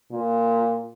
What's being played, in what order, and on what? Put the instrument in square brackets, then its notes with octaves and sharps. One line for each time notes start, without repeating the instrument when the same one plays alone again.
[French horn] A#2